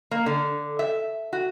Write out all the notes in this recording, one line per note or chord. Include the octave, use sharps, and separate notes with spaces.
A#3
D3
E5
F#4